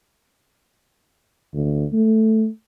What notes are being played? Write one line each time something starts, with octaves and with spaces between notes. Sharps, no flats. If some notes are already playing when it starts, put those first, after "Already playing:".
D2
A3